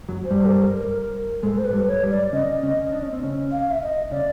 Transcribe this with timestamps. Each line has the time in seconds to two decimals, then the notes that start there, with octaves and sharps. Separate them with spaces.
0.09 F#2 F#3
0.24 C5
0.31 G2 G3
0.46 A4
0.53 A#4
1.43 G#2 G#3 A4
1.58 C5
1.65 B4
1.73 G2 G3
1.88 C#5
2.03 G2 G3
2.11 D5
2.32 C#3 C#4 D#5
2.63 C#3 C#4
2.92 D4
3.03 C#4
3.13 C4
3.23 C#3 C#4
3.52 F5
3.71 E5
3.82 D#5
4.11 C#3 C#4 D5